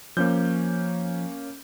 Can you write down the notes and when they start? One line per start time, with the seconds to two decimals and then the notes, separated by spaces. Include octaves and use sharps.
0.17 F3 A#3 C#4 G6